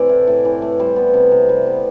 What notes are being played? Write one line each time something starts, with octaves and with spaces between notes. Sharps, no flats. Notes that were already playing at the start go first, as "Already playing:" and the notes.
Already playing: C3 E3 A3 C5 D5
A2
A2
E3
A3
G3 C5
B3
C3
C3
G3
B3